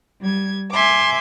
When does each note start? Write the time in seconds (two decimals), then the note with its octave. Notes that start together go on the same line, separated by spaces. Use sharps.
0.22 G3 G#6
0.71 E5 G#5 C6 D6